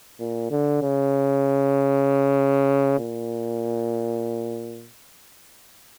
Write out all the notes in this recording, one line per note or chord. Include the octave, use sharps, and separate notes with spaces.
A#2
D3
C#3
A#2